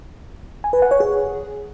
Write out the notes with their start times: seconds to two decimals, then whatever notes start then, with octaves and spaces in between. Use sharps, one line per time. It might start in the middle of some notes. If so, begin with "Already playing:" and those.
0.64 G#5
0.73 B4
0.82 F#5
0.91 C#5
1.00 G#4